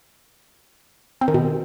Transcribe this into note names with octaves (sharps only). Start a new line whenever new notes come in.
C4
D#3
B2